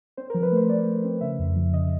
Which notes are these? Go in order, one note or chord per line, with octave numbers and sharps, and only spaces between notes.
C4 C5
A#4
F3
B4
A3 C5
A3 D5
A3
C4
C#3 E5
F2
F3
C#3 D#5